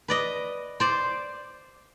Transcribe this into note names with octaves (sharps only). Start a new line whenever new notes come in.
B4 D5 D#5
C5 D5